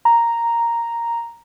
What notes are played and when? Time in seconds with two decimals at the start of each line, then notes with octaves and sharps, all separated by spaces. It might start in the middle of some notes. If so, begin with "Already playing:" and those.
0.05 A#5